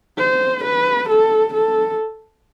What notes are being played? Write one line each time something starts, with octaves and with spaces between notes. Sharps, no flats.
C5
B4
A4
A4